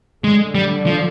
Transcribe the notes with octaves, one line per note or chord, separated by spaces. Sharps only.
D3 G#3
G3
F3